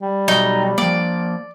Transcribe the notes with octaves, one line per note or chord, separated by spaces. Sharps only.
G3
B2 F#3 D#4
F3 A#3 D5